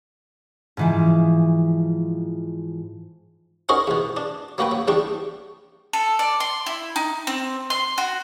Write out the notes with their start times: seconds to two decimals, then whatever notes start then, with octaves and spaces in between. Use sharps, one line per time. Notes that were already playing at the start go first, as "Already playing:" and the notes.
0.77 G#2 E3 F3
3.69 C#4 D#4 F#4 A#4 C5
3.87 E2 B2
4.17 D4
4.58 F#3 A#3 F#4 B4 G5
4.71 F#3
4.88 E2 G3 D4 G5 C#6
5.93 A4
6.19 D5
6.40 C6
6.66 E4
6.96 D#4
7.27 C4
7.70 C6
7.98 F#4